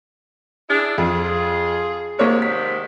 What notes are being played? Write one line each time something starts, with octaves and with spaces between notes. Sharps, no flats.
D4 E4 G#4
F2 F4 G#4
G#2 C3 D#3 A#3 C#5
B6